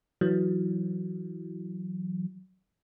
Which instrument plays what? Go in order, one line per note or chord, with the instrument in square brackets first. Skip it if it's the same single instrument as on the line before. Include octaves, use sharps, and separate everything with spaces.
[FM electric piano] E3 F#3